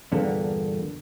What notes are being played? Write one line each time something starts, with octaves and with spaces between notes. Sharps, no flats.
E2 G2 A#2 D3 A#3 B3